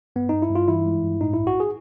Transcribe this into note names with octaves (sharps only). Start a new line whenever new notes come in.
G2 B3
G2 D#4
E4
G2 F4
E3 E4
G#3
G2
A2 D#4
B1 E4
F#4
G#4